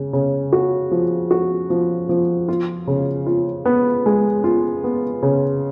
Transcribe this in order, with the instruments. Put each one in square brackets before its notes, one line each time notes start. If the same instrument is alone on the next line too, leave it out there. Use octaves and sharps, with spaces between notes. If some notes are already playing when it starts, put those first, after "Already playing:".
Already playing: [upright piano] C#3
C#3
F#4
F3
F#4
F3
F3
F4
C#3
F4
B3
G#3
F4
B3
C#3